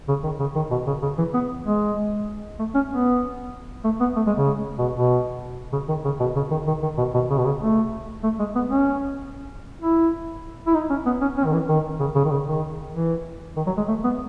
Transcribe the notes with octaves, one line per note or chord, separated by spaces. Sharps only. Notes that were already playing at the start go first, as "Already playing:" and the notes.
C#3
D#3
C#3
D#3
B2
C#3
C#3
E3
B3
G#3
A3
C#4
B3
A3
B3
A3
G#3
C#3
B2
B2
C#3
D#3
C#3
B2
C#3
D#3
D#3
D#3
B2
B2
C#3
B2
C#3
A3
A3
G#3
B3
C#4
E4
E4
D#4
C#4
B3
C#4
C#4
D#3
E3
D#3
C#3
C#3
D#3
C#3
D#3
E3
D#3
F#3
G#3
A3
B3